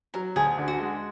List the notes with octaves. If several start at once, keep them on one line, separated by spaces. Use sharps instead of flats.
F#3 A#4
D2 G#4
D3
F#4
G#3